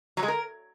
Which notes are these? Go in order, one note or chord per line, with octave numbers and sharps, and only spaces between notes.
F#3
G#3
A#4